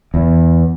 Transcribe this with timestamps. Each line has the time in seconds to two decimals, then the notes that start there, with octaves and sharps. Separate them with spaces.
0.14 E2